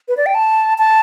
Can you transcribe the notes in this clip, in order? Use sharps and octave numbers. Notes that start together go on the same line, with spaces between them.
B4
D5
G5
A5
A5